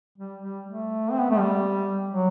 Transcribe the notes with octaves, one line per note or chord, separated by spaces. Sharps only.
G3
G3
A3
C4
B3
A3
G3
F#3